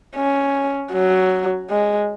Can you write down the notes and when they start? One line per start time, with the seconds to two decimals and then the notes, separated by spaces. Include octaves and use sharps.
0.16 C#4
0.93 F#3
1.70 G#3